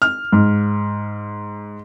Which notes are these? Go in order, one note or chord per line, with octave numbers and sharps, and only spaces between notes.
F6
G#2